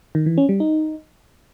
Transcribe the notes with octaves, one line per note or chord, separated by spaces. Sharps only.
D#3
E3
C#4
G3
D#4